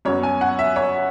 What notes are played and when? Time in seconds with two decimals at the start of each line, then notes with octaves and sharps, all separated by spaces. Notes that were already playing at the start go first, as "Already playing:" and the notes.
0.05 F#2 F#3 B3 C#5
0.23 G#5
0.41 F#5
0.59 E5
0.76 C#5